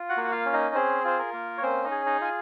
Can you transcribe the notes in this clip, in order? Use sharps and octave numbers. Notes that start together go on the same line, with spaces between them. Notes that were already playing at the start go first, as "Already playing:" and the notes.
Already playing: F4
F#4 F#5
A#3
F#5
F4 F5
C#4
D#4 D#5
C4 G#4 C5
F4 C5
A#4
A#3
C#5
C4 C#4 C5
D#4 D#5
G#4
D#4 D#5
F4 G#5